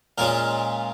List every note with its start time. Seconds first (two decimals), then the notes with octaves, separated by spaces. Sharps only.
0.18 A#2 G#3 C#4 F4 A#4